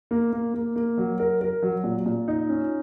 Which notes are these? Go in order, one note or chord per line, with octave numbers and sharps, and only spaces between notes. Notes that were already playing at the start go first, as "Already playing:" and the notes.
A#3
A#3
A#3
A#3
F#3
A#4
A#4
F#3
A#2
A#2
D#4
C#4